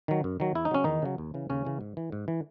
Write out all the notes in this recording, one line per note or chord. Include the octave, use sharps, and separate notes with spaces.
D#3 F#3
F#2
D#3 F#3
E2 E4
D#4
C#3 F#3 C#4
E2 D#3 D#4
C#3 F#3
D#2
C#3 E3
D#2 C#3 C#4
C#3 E3
G#2
E3
G#2
E3